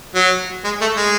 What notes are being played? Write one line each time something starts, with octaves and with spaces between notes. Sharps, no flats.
F#3
G#3
A3
G#3